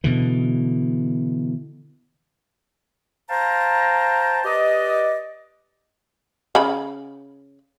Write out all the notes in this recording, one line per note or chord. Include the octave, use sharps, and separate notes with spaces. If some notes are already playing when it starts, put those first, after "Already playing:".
B2 D3 E3
C5 F5 G5 A5 A#5
G4 B4 D5 D#5
C#3 B5